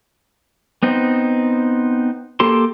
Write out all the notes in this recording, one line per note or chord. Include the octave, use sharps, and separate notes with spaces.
B3 C4 D#4
A#3 G4 A4 C6